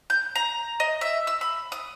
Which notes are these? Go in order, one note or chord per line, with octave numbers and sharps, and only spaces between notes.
G6
A#5
D#5
E5
E6
B5
D#6